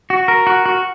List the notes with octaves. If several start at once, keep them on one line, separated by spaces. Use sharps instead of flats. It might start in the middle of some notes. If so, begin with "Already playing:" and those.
F#4
A#4
F#4
F#4